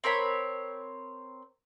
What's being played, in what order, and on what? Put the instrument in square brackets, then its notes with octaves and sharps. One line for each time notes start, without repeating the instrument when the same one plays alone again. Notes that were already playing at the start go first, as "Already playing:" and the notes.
[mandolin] C4 A#4 C#5 B5